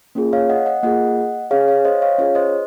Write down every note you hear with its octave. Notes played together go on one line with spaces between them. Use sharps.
A#3 C#4 F4 G#4
C#5 F5
D#5 F#5
D#5 F#5
A#3 F4 G#4 D#5 F#5
C#4 G#4 C#5 F5
C#5 F5
C5 D#5
C#5 F5
C#4 F4 G#4 C#5
C5 D#5